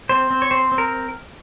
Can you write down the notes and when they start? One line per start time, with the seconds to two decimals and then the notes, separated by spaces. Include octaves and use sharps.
0.09 C4 C5
0.31 C4
0.42 C#5
0.51 C4 C5
0.72 C4
0.78 A#4